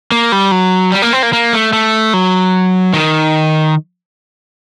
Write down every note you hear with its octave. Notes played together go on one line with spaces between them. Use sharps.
A#3
G3
F#3
G3
A#3
C4
A#3
A#3
A3
A3
F#3
D#3